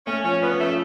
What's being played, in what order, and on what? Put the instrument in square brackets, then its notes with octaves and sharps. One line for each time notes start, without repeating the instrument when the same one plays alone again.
[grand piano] A3 [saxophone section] C#4
[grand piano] F3 [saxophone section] C#4
[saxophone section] B3 [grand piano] C#4
[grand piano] F3 [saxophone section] A3